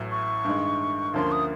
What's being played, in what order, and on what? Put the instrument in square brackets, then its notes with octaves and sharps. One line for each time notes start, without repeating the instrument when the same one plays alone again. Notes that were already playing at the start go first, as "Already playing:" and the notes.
Already playing: [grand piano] A1 A2 F#3
[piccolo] C#6
[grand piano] G2 D#3 G#3
[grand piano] D2 D3 F3 A#3 C#4 [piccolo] C6
[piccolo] D#6